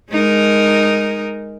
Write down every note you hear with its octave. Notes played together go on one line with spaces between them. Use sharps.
G#3 D#4 A#4